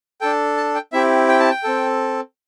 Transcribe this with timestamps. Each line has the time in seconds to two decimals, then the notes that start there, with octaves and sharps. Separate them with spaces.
0.21 D4 A4 G5
0.57 A5
0.75 G5
0.92 C4 E4 G4 E5
1.28 G5
1.40 A5
1.50 G5
1.63 C4 A4